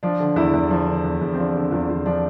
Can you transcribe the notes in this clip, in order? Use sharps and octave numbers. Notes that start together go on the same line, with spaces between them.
F3 D4
D3
E2 E4
E2
F3
D3
E2
E2
C4
F3 D4
D3
E2 F4
E2 F4
F3 D4